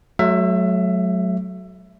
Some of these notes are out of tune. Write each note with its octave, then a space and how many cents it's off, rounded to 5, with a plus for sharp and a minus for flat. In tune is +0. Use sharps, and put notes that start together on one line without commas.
F#3 +0 A3 -35 E5 +20